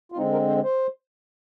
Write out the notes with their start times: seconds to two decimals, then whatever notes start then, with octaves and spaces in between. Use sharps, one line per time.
0.12 F4
0.16 D3 G#3 C4 D#4
0.32 A#4
0.48 C5
0.64 C5